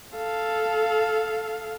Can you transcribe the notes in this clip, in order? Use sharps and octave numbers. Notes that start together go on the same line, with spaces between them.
A4 F5